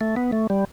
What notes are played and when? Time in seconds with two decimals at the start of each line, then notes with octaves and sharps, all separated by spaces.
0.01 A3
0.16 B3
0.32 A3
0.50 G3